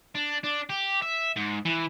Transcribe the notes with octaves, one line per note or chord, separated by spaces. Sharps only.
D4
D4
G4
E5
G#2
E3